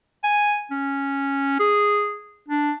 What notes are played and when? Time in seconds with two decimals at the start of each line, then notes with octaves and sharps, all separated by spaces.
0.24 G#5
0.71 C#4
1.60 G#4
2.49 D4